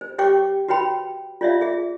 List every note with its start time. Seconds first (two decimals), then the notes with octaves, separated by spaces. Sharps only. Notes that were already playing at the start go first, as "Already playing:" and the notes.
0.01 C5
0.18 G4 C#5 G5 D6
0.68 F#4 B4 C#5 G5 B5
1.41 F4 C#5 D5 E5 F5
1.61 G#4 E5